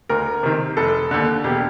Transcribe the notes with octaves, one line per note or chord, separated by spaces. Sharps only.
D2 A#4
C3 D#3
F1 A4
D#2 D3
E1 G4